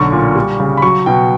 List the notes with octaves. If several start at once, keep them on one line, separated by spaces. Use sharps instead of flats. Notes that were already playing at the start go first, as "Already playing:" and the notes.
Already playing: B1 D3 C#6
A#2
G3
C#3
B5
F#3 C#6
B2 G5